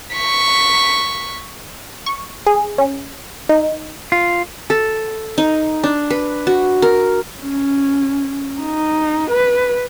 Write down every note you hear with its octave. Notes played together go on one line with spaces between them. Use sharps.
C#6 B6
C#6
G#4
C#4
D#4
F4
A4
D#4
D4
B4
F#4
A#4
C#4
D#4
B4